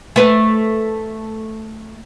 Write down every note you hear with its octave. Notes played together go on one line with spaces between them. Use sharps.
A3 B4